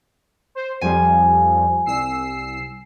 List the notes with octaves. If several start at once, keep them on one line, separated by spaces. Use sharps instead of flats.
C5
F2 F3 G3 G#5
C2 E6 C7